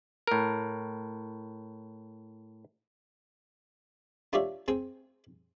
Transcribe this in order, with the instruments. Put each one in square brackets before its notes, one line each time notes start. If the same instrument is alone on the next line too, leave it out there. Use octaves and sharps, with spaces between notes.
[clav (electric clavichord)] A2 A#4
[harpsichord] D4 F4 G4 C#5 D5 E5
C4 G#4 G5